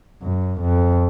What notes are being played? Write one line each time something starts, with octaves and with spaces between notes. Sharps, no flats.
F#2
F2